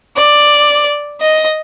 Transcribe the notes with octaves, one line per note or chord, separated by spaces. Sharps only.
D5
D#5